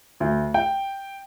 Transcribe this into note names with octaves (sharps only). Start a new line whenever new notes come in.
D2
G5